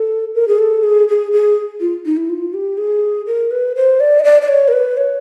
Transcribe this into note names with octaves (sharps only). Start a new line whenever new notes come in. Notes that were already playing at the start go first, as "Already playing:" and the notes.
Already playing: A4
A#4
G#4
A4
G#4
G#4
G#4
F4
D#4
E4
F4
G4
G#4
A#4
B4
C5
D5
D#5
D5
D5
C#5
A#4
B4
C#5